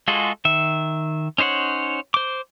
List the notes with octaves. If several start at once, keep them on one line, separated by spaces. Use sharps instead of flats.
G#3 F4 F#4 G#4 A4
D#3 E5
C#4 D#4 C5 C#5 F#5
C5 D6